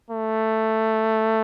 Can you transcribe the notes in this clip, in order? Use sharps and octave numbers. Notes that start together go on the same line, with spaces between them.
A3